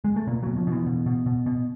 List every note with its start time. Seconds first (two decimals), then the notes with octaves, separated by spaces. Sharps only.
0.04 G#3
0.16 A3
0.27 B2 A#3
0.43 B2 F#3
0.57 F3
0.67 B2 E3
0.86 B2
1.06 B2
1.26 B2
1.46 B2